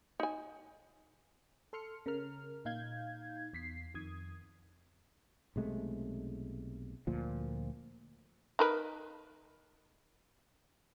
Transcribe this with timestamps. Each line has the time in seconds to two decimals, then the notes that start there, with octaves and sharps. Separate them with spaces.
0.20 D#4 G#5
1.73 A4 C6 F6 C#7
2.06 C#3 A#4 F6
2.65 A#2 D#4 F5 G6 G#6
3.53 E2 B6 C7
3.94 F2 D#3 D#6 G#6
5.56 B1 C3 G#3 A3
7.07 D2 A#2 F3
8.59 D#4 A#4 B4